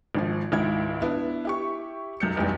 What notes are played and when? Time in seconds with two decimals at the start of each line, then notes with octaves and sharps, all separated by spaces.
0.15 G#1 D#3 F3
0.52 G#1 C#2 D#3 E4 G#6
1.02 B3 D4 E4
1.45 E4 G4 C#6
2.20 B1 F#2 G6 C#7
2.36 F1 B1 E2 G3